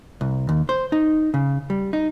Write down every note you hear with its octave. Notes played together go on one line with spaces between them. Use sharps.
C2
D#2
C5
D#4
C#3
G3
D#4